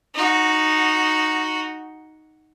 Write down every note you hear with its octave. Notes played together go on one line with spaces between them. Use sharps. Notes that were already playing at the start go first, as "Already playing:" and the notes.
D#4 F#4